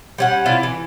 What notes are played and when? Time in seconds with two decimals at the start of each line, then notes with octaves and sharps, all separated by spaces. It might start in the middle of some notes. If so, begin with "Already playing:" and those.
0.18 G3 C#4 F#5
0.46 C3 E4 F4 D5
0.63 E3